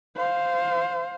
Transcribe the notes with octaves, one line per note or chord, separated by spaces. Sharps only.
C5 F5